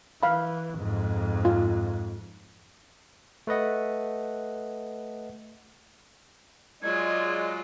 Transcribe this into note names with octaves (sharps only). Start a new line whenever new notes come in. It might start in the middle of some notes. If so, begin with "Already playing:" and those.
E3 F5 B5
F2 G#2
F4
A3 B4 D#5 F#5
F#3 G#3 F4 D5 G#6